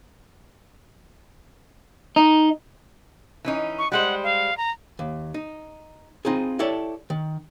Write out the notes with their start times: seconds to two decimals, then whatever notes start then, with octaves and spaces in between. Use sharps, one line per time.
2.16 D#4
3.45 E3 C#4 D#4
3.78 C#6
3.92 G3 G#3 C5 F#5
4.23 F5
4.57 A#5
4.99 D#2
5.34 D#4
6.25 C4 D#4 F4 G#4
6.59 E4 G4 A4 C#5 D5
7.10 D#3